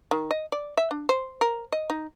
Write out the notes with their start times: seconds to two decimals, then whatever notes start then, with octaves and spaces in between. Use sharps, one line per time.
0.11 D#3
0.31 D#5
0.52 D5
0.77 E5
0.91 D4
1.09 C5
1.41 A#4
1.72 D#5
1.90 D#4